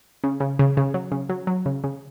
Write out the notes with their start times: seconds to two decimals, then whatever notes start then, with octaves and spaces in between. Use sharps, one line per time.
0.24 C#3
0.40 C#3
0.59 C#3
0.77 C#3
0.94 F#3
1.12 C#3
1.29 F#3
1.47 F#3
1.66 C#3
1.84 C#3